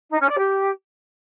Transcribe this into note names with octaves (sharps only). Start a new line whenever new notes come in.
D#4
C#4
D5
G4